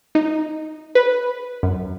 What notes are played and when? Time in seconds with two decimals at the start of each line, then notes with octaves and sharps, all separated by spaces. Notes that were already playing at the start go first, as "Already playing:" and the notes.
0.15 D#4
0.95 B4
1.63 F#2